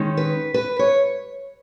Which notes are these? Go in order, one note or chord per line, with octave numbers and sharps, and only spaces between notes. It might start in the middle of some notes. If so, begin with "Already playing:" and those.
Already playing: D#3 G#3 C#4
B4
B4
C#5